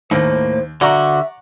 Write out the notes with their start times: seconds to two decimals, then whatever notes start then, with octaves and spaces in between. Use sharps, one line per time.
0.11 D#2 A2 A#3 C5
0.81 D3 F#4 D5 E5 A#5 C#6